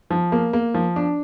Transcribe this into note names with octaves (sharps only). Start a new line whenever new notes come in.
F3
A#3
A#3
F3
D4